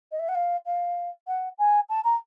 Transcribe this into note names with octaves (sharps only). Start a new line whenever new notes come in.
D#5
E5
F#5
F5
F5
F#5
G#5
A5
A#5